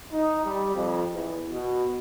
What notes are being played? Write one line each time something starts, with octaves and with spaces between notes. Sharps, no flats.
D#4
G3
F2
E2
B2